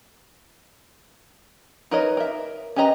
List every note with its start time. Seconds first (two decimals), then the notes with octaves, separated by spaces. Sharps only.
1.91 D#4 A#4 B4 C#5 D#5
2.17 A#4 E5
2.76 C#4 G4 B4 D#5 A#5